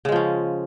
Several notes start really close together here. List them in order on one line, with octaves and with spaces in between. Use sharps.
C#3 G#3 F3 C#4